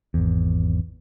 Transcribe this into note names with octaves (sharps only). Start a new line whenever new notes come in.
G#1 E2